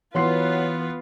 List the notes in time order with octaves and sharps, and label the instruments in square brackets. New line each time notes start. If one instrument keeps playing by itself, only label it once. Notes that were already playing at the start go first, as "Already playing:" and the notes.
[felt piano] E3 C6 C7 [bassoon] F#3 [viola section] B3 [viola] F4 B4